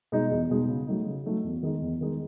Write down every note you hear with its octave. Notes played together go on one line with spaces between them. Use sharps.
B2 G#3 D#4
E2
B2 G#3 D#4
C#3
F#3 A3 D#4
C#3
F#3 A3 D#4
E2
D#3 G#3 D#4
E2
D#3 G#3 D#4